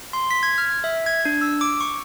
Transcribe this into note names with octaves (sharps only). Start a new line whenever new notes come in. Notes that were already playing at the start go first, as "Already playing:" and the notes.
C6
B6
G#6
F6
E5
G#6
D4
E6
D6
C#6